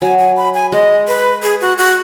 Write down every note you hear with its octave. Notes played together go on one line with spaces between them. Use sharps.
F#3 G#5
G#5
B5
G#5
G#3 D#5
B4
G#4
F#4
F#4